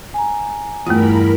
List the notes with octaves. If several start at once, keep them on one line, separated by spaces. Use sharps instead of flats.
G#5 A#5
E2 G2 A3 F4 A#4 B5